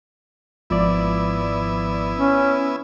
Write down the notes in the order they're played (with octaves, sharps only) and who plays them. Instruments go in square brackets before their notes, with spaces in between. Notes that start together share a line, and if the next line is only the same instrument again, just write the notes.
[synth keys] G#1 F3 D5 [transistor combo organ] B3 E4
[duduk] C#4